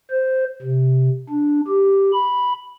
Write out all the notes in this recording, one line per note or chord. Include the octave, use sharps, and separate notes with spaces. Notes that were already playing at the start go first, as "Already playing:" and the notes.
C5
C3
D4
G4
B5